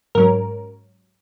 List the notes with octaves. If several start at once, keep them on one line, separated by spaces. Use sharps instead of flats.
G#2 F#3 C#4 A#4